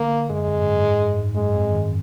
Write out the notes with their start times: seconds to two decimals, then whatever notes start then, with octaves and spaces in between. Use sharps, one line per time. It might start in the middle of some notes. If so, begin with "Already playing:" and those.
Already playing: D3 A#3
0.30 F#2 G#3
0.48 F2
0.60 G#2
0.66 F#2
0.83 G#2
1.00 F#2
1.19 G#2
1.35 F#2 G#3
1.54 F2
1.71 D#3